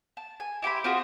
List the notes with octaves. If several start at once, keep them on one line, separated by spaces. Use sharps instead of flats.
A5
G#5
E4 G4 C5 B5
C4 F4 F#4 G#4